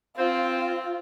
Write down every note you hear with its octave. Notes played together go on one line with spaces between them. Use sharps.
C4 F4